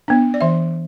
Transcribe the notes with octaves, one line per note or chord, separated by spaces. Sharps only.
B3 D4
D5
E3 E5